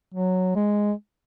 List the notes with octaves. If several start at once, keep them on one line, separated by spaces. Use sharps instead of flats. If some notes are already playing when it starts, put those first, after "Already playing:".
F#3
G#3